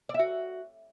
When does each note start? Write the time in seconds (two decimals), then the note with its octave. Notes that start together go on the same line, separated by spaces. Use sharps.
0.09 D5
0.14 E5
0.19 F#4